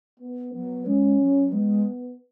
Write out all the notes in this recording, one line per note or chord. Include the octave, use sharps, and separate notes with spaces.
B3
F#3 B3
G#3 C#4
F#3
G#3 B3